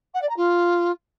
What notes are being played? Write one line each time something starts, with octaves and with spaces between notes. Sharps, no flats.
F#5
D5
A#5
F4